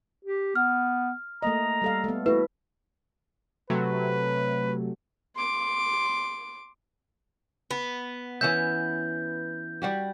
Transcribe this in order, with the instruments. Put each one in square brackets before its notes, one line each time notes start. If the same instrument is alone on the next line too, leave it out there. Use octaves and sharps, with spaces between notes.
[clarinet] G4
[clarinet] B3 [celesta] F6
[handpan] A3 A#3 D#5 [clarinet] A#5
[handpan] G3 A4 F5
A3 B3
[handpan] A3 E4 [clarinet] F#4 [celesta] B4
[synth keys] C3 F#3 A3 [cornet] B4
[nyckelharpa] C6 D6
[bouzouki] B3
[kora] E3 C#4 E5 [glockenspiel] G6
[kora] G3 F#4 G4